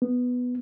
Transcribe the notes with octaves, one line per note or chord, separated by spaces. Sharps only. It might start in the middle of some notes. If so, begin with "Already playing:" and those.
B3